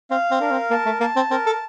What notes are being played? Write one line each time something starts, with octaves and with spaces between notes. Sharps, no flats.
C4 F5
C4
D4 A#4
C4
A#3 A5
A3
A#3 A5
C4
C4 A#4
A4